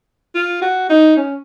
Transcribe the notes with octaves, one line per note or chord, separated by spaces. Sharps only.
F4
F#4
D#4
C#4